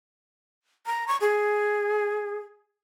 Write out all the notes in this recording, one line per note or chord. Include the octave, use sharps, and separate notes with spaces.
A#5
C#6
G#4